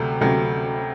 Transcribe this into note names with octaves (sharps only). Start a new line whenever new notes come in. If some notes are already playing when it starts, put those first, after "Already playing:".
Already playing: D2 C3 F#3 A3
D2 C3 F#3 A3